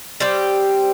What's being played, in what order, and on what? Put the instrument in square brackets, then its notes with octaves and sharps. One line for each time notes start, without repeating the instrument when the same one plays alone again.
[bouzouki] G3 C4 G4